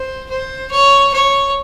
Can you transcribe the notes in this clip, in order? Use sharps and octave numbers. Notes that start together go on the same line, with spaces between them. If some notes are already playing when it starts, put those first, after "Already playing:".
Already playing: C5
C5
C#5
C#5